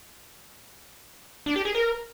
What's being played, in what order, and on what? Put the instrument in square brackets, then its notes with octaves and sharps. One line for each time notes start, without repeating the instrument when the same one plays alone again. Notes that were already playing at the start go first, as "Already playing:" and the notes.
[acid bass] D4
G4
G#4
A#4